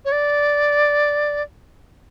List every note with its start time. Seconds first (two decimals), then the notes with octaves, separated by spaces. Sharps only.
0.05 C#5
0.12 D5